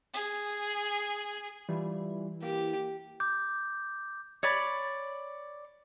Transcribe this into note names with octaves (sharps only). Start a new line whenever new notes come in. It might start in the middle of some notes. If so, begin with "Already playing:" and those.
G#4
E3 G3 E4 F4
A#3 G4
D6 G6
C#5 D5 B5